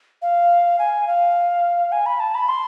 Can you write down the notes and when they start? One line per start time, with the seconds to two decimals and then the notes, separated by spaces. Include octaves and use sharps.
0.22 F5
0.79 G#5
1.07 F5
1.92 G#5
2.06 B5
2.20 A5
2.35 B5
2.48 C6